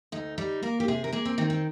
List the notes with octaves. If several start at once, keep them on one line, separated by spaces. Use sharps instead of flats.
D2 D#4
G3 D#4
A#3 A#4
G4
C3 G#4
A#4
A#3 G#4
C4
D#3 C4
C4